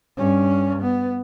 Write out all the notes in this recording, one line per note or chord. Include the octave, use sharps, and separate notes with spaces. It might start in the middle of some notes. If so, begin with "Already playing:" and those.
G2 C#4
B3